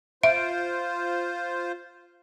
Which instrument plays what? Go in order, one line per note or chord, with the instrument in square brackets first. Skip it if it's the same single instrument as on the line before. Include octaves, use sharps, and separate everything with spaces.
[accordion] F4 C5 [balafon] E5